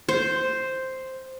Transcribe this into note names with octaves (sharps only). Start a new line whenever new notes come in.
C5